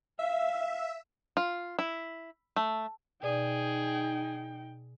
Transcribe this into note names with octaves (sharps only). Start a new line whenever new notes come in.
E5 F5
F4
E4
A3
B2 D#4 G#4 D5 G5